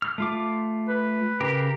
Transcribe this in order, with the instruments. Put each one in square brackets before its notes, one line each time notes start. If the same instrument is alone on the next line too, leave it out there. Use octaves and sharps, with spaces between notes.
[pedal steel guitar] F6
A3 F4 D6
[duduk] B4
[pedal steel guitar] C#3 G4 A#4